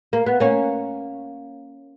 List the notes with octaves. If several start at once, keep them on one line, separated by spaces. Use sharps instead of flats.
A#3
B3
A#3 C#4